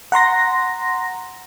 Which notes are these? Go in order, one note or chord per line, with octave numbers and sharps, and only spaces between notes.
F#5 A#5 C6 A#6